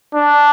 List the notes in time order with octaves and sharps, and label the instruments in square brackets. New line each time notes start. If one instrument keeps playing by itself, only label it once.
[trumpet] D4